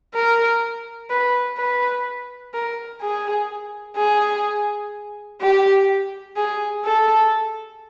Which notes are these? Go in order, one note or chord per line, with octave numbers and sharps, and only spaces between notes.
A#4
B4
B4
A#4
G#4
G#4
G4
G#4
A4